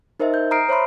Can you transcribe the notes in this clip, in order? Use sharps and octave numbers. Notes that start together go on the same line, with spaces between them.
D#4 A#4 C5 D#5 E5
G6
A#5 D#6 F6 C7 D7
C5 C#5 E5 B5 C6